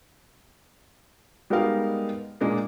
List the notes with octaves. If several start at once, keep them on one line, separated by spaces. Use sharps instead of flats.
G3 G#3 B3 D#4 A#4 F5
A#2 G#3 A#3 D4